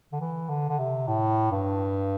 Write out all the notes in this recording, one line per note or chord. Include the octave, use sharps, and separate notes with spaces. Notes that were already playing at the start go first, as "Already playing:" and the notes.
D3
E3
D3
D3
C3
A2
G2